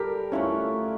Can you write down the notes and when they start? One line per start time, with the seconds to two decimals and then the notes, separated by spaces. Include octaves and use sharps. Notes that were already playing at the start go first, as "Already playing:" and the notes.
Already playing: G3 D4 G4 A4 A#4
0.32 A3 C#4 D4 E4 F4 C#5